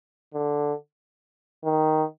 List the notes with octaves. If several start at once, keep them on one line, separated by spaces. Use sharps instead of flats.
D3
D#3